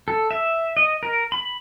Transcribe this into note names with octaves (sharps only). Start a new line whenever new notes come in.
A4
E5
D#5
A#4
B5